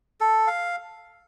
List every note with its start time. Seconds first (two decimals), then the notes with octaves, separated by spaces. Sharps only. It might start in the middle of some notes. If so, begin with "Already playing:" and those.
0.20 A4
0.47 F5